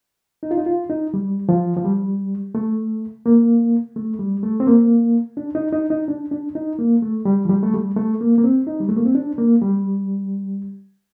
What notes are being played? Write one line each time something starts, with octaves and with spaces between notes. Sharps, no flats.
D#4
F4
D#4
F4
D#4
G3
F3
F3
G3
A3
A#3
A3
G3
A3
C4
A#3
D4
D#4
D#4
D#4
D4
D4
D#4
A#3
A3
G3
F3
G3
A3
G3
A3
A#3
A#3
C4
D#4
G3
A3
A#3
C4
D4
A#3
G3